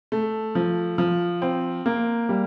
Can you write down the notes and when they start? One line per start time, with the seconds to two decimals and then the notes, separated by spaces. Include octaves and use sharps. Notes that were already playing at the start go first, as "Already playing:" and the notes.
0.12 A3
0.55 F3
0.98 F3
1.42 C4
1.86 A#3
2.29 G3